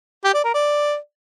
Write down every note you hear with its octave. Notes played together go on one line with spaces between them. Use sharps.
G4
D5
A#4
D5